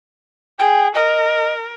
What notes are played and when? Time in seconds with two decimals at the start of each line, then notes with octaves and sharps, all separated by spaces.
0.59 G#4 G5
0.95 A#4 D#5